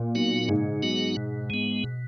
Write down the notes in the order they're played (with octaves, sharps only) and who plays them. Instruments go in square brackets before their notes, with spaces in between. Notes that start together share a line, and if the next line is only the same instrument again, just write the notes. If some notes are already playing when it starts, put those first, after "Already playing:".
Already playing: [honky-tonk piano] A#2
[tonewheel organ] F#3 B3 D#4 F#4
[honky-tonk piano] G#2 [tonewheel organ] C#3
[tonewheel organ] F#3 B3 D#4 F#4
B2
G#3 B3
B2